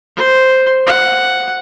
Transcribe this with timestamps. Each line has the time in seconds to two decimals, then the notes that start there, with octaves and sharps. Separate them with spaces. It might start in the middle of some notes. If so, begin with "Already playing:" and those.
0.16 C5
0.87 F#5